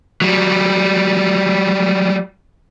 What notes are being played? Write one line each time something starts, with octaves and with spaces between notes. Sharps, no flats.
F#3 G3